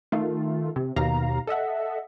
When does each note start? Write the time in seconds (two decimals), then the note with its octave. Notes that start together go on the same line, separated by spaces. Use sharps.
0.12 D#3 A3 F4
0.76 C3
0.96 D#2 B2 F5 A#5
1.47 A4 D#5 E5 F#5